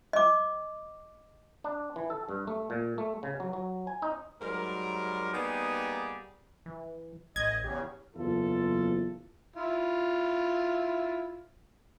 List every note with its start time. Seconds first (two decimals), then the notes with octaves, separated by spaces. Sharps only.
0.13 D#5 D6
1.64 D4
1.96 E3
2.10 A4
2.29 G2
2.47 A3
2.70 A#2
2.98 A3
3.23 C#3
3.40 F#3
3.53 F#3
3.87 G#5
4.02 D#4
4.41 G#2 F#3 G3 A#4
5.33 G3 A#3 B3 D#4 G4 G#4
6.66 E3
7.36 A1 D#5 G#6
7.64 E2 C#3 G4
8.15 F#1 E2 F4 A4
9.56 E4 F4